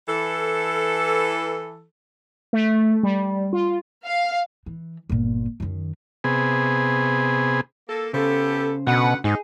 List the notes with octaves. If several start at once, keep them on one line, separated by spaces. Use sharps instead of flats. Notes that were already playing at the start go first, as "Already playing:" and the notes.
E3 A4
A3
G3
F4
F5
E3
G1 A#2
F#2 D#3
C3 B3 G#4
A#3 A4
C#3 B3 G4 A4 C5
D2 B2 B4 F#5
G#2 D#4 G#4